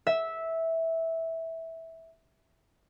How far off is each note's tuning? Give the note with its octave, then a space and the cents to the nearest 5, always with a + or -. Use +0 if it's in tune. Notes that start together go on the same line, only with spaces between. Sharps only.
E5 -10